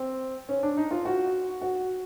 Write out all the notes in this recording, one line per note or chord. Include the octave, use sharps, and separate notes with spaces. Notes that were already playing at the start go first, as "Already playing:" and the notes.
Already playing: C4
C#4
D4
D#4
F4
F#4
F#4